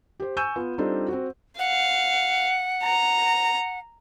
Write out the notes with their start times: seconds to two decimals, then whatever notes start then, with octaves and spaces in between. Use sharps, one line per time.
0.20 G4 C5
0.37 G#5 C#6 E6 G6 D#7 E7
0.56 B3 F4
0.78 G3 C4 D4 D#4 F4 A4
1.08 C4 F#4
1.59 F5 F#5
2.84 A#5